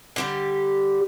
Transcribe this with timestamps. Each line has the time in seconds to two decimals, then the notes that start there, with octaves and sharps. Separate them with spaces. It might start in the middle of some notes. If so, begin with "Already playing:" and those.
0.16 D3 G3 G4